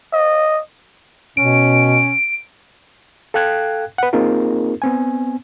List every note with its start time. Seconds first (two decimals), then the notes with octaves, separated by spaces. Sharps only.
0.13 D#5
1.37 B2 C#4 D7
3.34 A4 F5 G5 F#6 G#6
3.98 B4 F#5
4.13 A#3 C4 D#4 F4 G#4 A#4
4.82 B3 C4 G#5